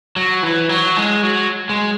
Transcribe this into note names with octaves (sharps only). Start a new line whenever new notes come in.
F#3
E3
F#3
G#3
F#3
G#3